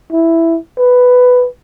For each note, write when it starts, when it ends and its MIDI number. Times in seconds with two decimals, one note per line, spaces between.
0.12 0.57 64
0.78 1.46 71